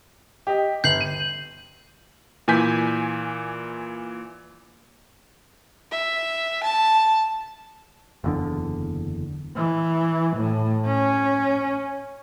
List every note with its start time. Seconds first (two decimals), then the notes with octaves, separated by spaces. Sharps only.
0.47 G4 D#5
0.84 G1 G6 C7 F#7
1.01 D#7
2.48 A#2 E3 G#5 G6 B6
5.91 E5
6.64 A5
8.24 F#1 E2 D3
9.56 E3
10.36 A2
10.86 C#4